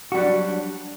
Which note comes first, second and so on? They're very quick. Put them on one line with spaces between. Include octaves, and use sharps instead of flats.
F#4 G3 F#3 D4